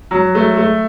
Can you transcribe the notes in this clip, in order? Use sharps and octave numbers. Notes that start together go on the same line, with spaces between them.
F#3
A3
A3